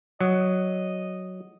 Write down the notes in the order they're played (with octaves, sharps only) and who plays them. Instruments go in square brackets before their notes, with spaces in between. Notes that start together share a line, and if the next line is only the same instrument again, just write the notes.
[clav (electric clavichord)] F#3 [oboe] D#5